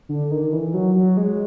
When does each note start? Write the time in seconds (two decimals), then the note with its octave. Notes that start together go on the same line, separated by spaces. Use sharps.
0.09 D3
0.31 D#3
0.53 E3
0.74 F#3
0.95 F#3
1.17 G#3